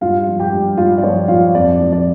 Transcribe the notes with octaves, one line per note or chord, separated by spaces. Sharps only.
G2 F4 F5
F3
G4 G5
G2
G2 F4 F5
D5
F3 C#5
F3 F4 F5
F2 D5
F3
D5